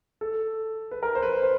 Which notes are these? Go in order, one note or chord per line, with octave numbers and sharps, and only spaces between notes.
A4
B4
A#4
C5
B4
C5